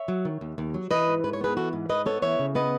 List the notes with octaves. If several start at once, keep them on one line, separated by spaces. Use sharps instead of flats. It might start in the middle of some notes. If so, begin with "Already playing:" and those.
Already playing: C#5 E5
F#3
D#3
D#2
D#2
F#3
E3 B4 D#5
G#2
G#2 B4
C#5
B3 G#4 B4
E3 F#4 A4
G#2
G#2 B4 D#5
B3 A4 C#5
E3 C#5 E5
C#3
B3 B4 D#5